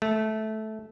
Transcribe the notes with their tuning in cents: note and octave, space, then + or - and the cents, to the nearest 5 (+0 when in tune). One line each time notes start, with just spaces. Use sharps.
A3 -15